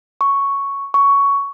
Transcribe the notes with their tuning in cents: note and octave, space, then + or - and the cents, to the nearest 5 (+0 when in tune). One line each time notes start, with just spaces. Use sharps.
C#6 +0
C#6 +10